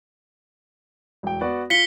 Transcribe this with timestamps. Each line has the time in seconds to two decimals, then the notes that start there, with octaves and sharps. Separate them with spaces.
1.23 E1 G5
1.41 B3 F#4 D5
1.70 F4 B6 C#7 G7